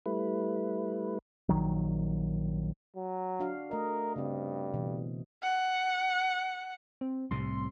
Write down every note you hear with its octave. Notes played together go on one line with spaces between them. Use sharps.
G3 A3 E4 B4
A#1 D#3 F#3
F#3
D4 F#4 F5
A3 A#4 D#5
G2 C#3 C4
B2 E3
F#5
C4
C2 A2 C3 C6